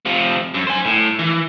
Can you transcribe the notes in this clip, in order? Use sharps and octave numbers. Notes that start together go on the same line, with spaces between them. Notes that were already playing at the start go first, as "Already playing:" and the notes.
C3 F3
F#2
C5 G#5
A2
E3